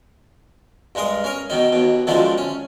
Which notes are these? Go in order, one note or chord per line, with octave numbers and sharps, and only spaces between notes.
G2 G#3 A#4 D#6
C#4 A#4
B2 D#3 D#4
D#2 B2
F#2 D3 D#3 F3 G#3 A3
C#4